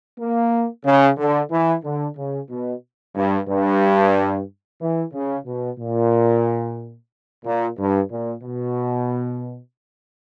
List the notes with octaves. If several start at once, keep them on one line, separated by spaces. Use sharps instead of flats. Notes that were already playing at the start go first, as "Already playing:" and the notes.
A#3
C#3
D3
E3
D3
C#3
B2
G2
G2
E3
C#3
B2
A#2
A#2
G2
A#2
B2